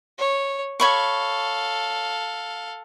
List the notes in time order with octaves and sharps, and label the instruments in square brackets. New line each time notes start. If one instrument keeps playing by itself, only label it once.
[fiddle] C#5
[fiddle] A4 F5 [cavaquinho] C#5 B5 C#6